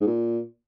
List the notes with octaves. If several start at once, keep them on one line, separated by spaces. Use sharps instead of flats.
G#2
A#2